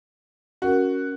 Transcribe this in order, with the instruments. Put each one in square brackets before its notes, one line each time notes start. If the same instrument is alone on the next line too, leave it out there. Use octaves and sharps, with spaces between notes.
[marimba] C#4 A#4 [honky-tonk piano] F#4